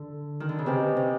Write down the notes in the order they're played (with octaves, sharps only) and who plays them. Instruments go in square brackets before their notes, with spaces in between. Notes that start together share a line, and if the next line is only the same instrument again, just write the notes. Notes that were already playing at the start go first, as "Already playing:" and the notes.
Already playing: [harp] D3
D#3
D3
C#3
[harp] C3 [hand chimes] G4 B4 D#5 G#5
[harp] C3